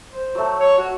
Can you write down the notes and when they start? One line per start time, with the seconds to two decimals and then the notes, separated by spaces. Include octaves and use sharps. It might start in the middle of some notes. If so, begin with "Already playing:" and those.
0.12 C5
0.35 F#3 A3
0.60 C#5
0.78 F#4